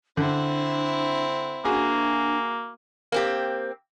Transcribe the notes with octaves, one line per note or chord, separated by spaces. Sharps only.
D3 C4 D4 E4
A#3 D4 F#4 G#4 G#5
A#3 C4 G4